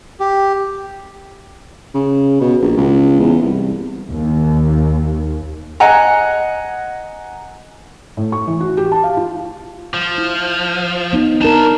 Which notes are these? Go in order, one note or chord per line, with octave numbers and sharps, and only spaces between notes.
G4
C#3
B2
A#1
C#2
E2
C2
D#2
D#5 F#5 G#5 A#5
A2
C#6
E3
F#4
G4
A5
F5
F4
F3
E4
B3 D#4
D4 D#4 A#4 A5